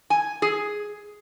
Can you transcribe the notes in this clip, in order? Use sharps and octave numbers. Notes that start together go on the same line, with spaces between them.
G#5
G#4